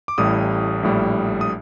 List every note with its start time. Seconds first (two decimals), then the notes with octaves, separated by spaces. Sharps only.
0.08 D6
0.18 A1 A2 G3 D#6
0.83 A#1 A2 G3
1.41 D#6